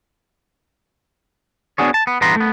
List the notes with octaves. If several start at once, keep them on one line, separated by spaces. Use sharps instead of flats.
B3 D4 F#4 G#4 C#5
A5
B3
E2 G2 E3 B3 A#5 C6
A3 B3